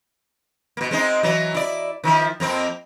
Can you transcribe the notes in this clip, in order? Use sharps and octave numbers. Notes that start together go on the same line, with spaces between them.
B2 A#3
G#3 C4 D#4
E3 F#3
E4 D5
D#3 F3 E4
F2 A#3 C4